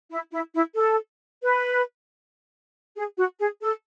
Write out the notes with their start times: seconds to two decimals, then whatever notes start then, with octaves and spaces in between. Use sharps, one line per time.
0.11 E4
0.32 E4
0.54 E4
0.76 A4
1.42 B4
2.96 G#4
3.17 F#4
3.39 G#4
3.62 A4